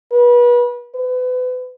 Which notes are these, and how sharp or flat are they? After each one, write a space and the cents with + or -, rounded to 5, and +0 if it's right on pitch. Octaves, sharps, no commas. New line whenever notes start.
B4 -30
B4 +30